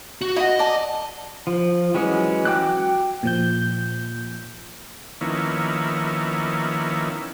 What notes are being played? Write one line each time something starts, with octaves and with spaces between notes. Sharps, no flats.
F#4
E4 F#4 D#5
D5 A5
F3
E3 F#3 G#3 C#4
F#4 G5 D6 E6 F#6
A#2 F3 G6
D#3 F3 A#3 B3 C#4 E4